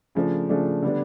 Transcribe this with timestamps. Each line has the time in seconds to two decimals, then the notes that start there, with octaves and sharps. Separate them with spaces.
0.15 C#3 F3 A3 D4
0.49 C#3 F3 A3 D4
0.82 D3 G3 B3 D4